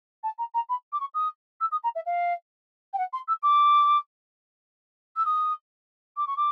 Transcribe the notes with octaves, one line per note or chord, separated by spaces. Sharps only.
A5
A#5
A#5
B5
D6
C#6
D#6
E6
D#6
A#5
E5
F5
G5
F#5
C6
E6
D6
E6
D#6
D6
C#6
D6